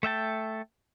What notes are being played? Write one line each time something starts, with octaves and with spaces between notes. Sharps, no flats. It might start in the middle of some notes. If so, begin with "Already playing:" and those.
A3 E5 G5 A5